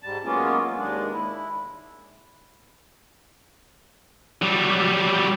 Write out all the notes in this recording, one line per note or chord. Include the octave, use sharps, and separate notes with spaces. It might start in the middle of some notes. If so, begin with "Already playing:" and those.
G#2 G3 A5
F#3 G#3 A#3 B3 C#4 F4
D#2 G#3 D4
E4
F#3 G3